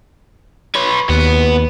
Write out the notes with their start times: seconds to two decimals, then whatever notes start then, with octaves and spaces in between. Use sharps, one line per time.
0.75 B4 C#5
1.09 D#2 B3